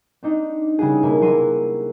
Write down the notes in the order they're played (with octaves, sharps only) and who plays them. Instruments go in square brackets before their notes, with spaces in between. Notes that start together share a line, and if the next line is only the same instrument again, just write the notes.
[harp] C4 D4 D#4
C#3 G3 E4 F#4 G#4
B2 A#3 E4
C3 F#3 E4 C6 D#7